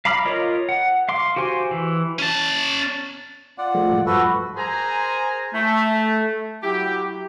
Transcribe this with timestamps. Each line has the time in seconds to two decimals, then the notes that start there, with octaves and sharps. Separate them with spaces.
0.05 F5 A#5 B5 D6 F6
0.25 F4 A#4 C#5 D#5
0.69 F#5
1.09 F5 C6 D6
1.36 F#4 G4 C5 G#5 C6
1.71 E3
2.19 C#4 A5
3.58 F4 D5 F#5
3.74 F3 G#3 A3
3.92 A2
4.06 G2 F3 F#4 A4 B4
4.57 G#4 A#4 C5 G#5 A#5
5.54 A3
6.62 F#3 E4 G4